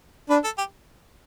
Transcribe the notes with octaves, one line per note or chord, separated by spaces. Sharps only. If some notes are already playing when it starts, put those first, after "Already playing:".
D4 B4
A4
G4